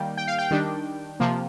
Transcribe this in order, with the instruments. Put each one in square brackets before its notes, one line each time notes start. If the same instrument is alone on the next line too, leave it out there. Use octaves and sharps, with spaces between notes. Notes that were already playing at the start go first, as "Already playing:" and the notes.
Already playing: [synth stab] D#3 G3 A#3 G5
G5
F5
G5
D#3 G3 D4
C3 F3 A#3